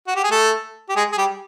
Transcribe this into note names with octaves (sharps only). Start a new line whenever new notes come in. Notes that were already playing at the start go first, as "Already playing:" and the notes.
F#4
G4
G#4
A3 A4
G4
G#3 G#4
G#4
G3 G4